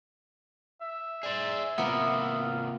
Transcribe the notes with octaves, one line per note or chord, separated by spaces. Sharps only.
E5
G#4 C5 D5
C3 A#3 B3 F4